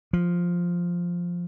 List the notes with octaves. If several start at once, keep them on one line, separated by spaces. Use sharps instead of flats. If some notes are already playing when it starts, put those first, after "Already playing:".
F3